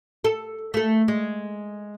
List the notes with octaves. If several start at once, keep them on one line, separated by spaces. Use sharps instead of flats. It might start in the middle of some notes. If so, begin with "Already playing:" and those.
A4
A3 A4
G#3